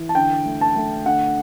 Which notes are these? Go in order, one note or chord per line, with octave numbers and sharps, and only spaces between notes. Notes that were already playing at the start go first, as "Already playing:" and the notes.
Already playing: E3
A5
D3 G5
A3
A5
A3
D3 F#5